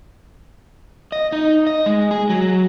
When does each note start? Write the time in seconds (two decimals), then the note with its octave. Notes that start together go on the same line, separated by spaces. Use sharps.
1.12 D#5
1.32 D#4
1.67 D#5
1.86 G#3
2.11 G#4
2.30 F#3